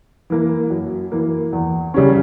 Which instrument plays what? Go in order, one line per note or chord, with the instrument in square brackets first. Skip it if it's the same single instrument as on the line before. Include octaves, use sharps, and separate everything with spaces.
[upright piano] E3 A#3
F#2
E3 A#3
E2
C#3 G3 C#4